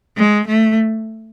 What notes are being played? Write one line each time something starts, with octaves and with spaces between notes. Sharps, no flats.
G#3
A3